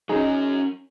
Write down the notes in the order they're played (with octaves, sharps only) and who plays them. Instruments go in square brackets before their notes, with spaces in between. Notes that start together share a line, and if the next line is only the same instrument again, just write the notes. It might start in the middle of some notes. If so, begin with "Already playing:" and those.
[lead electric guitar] F#3 C#4 [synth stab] D#4 G#4